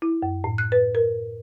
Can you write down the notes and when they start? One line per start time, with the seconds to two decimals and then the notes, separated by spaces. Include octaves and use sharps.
0.02 E4
0.22 F#2
0.44 A2
0.58 F#6
0.72 B4
0.95 A#4